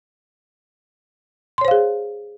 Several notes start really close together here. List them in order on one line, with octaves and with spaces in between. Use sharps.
C6 C#5 C5 F5 G#4